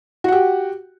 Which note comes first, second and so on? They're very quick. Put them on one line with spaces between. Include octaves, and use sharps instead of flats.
F#4 F#5 G4